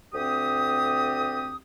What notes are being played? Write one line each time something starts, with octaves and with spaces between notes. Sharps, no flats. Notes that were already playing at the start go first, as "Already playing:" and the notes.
D2 C4 G4 D#6